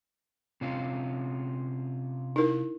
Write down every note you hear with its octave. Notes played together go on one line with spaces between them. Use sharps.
C3 C#4 F4
D#4 E4 A#4